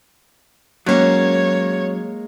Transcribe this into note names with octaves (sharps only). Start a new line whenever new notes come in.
F#3 G#3 A#3 C#4 C#5